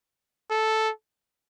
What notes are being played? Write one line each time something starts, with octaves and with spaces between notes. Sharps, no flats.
A4